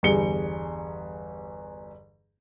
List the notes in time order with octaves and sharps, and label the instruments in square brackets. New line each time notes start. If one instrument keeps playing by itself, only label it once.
[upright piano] G1 E2 G3 G#4 C#7 G7